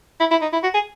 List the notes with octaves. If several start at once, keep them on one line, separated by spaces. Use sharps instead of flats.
E4
E4
D#4
E4
F#4
G#4